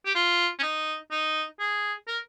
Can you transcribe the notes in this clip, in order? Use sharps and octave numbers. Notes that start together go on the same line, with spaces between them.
G4
F4
C#4
D#4
D#4
G#4
A#4